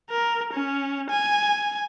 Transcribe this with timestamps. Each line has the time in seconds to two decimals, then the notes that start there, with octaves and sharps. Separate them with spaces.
0.10 A#4
0.53 C#4
1.10 G#5